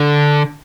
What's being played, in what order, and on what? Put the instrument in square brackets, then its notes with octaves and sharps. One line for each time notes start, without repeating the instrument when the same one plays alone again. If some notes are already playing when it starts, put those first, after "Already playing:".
Already playing: [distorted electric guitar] D3